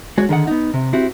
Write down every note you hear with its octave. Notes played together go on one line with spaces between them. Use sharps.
G#3 F#4 C#5
D3 D#3 G#4 F#5
B3 D#4
C3
C4 E4 F#4 G4